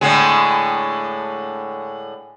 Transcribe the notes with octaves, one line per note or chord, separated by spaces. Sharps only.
A2 D3 G#3